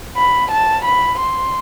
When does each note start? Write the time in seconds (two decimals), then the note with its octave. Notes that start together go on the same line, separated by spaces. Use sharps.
0.17 B5
0.51 A5
0.85 B5
1.20 C6